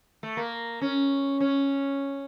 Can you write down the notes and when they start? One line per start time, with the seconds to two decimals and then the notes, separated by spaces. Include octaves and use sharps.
0.23 A3
0.37 A#3
0.81 C#4
1.40 C#4